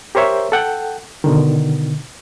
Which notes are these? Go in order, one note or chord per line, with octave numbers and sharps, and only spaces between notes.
G4 A#4 C5 C#5 E5
A4 F#5 G5
B2 D3 D#3